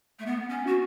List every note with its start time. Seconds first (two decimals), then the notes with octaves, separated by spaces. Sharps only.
0.19 A3
0.26 B3
0.49 C#4
0.67 F#4